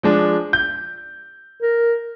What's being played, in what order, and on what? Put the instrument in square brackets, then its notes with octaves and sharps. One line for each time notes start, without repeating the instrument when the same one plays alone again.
[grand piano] F3 G#3 D4
G6
[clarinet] A#4